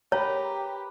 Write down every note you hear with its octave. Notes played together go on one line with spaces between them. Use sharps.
G4 B4 C#5 A#5 B5